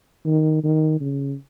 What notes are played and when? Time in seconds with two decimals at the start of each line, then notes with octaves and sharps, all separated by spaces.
0.26 D#3
0.63 D#3
1.01 C#3